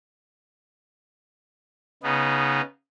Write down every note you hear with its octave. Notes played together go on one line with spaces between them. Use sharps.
C#3 B3 D#4